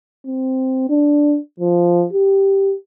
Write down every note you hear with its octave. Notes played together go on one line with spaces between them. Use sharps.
C4
D4
F3
G4